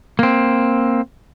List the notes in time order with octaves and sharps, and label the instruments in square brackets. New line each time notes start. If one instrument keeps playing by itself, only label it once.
[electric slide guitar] A#3 C4